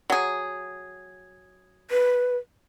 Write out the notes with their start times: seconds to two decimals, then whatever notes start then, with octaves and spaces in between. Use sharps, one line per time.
0.10 F#3 G#4
1.91 B4